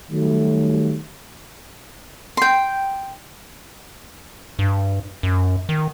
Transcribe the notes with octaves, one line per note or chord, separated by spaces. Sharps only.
D#3 F#3 G3 A3
G5 C6
G2
F#2
D#3